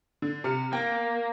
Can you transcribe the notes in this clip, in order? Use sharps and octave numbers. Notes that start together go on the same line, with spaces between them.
D3
C3 F6 C#7
A#3 G5